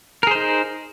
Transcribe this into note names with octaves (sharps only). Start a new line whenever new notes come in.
D#4 G#4 A#4 C5